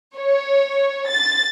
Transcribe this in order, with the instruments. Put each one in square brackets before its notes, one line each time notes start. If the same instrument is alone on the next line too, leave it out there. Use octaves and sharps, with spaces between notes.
[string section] C#5
A6